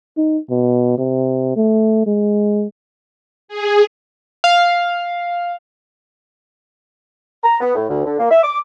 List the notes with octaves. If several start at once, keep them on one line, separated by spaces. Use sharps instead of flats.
D#4
B2
C3
A3
G#3
G#4
F5
A#5
B3
A2
D2
D3
A#3
E5
D6